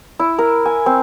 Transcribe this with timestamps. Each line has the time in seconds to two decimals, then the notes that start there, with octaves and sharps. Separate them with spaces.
0.19 E4
0.39 A#4
0.65 G#5
0.86 C4